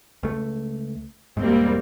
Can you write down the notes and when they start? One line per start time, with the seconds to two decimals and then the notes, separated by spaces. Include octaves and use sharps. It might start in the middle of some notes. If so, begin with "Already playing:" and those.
0.23 C#2 A3
1.37 E1 G#2 G3 A#3 C4